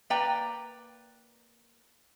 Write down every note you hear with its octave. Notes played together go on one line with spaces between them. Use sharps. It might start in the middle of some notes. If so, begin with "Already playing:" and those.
A#3 B4 D5 G5 A#5